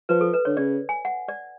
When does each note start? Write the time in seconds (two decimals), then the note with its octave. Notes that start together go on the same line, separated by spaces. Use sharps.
0.09 F3 B4
0.21 A4
0.33 B4
0.45 D3 C#5
0.57 C#3 D5
0.89 G#5
1.05 F#5
1.28 D5